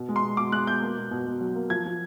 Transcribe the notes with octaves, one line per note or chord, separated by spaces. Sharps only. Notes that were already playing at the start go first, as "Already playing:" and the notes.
Already playing: B2
G#3
C6
B2
B2 D6
G#3 F#6
B2 G6
A#3
B2
B2
B2
F#3
A#3
F3 G#6
F3